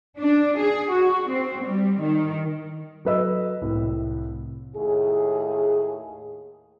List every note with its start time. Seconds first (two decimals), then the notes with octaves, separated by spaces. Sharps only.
0.19 D4
0.59 G#4
0.92 F#4
1.31 C4
1.63 G3
2.02 D#3
3.05 F#3 A4 B4 D#5 E6
3.62 C2 A2
4.76 D#2 A2 G#4